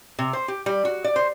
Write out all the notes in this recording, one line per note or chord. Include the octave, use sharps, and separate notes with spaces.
C3
C5
G4
G3
F#4
D5
C5